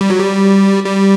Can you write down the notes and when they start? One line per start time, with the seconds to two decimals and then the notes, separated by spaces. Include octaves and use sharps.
0.01 G3
0.10 F#3
0.19 G3
0.86 G3